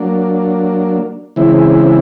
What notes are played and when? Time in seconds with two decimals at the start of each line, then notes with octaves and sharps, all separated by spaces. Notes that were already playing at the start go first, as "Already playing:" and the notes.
Already playing: F#3 A#3 D4
1.36 C#3 E3 G#3 C4 E4